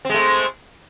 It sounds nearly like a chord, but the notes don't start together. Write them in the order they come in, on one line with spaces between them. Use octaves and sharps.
C4 G#3 A3